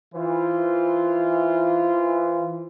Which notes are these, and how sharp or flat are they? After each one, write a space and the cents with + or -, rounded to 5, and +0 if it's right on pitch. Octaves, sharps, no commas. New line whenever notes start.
E3 -5 F4 -15 C5 +0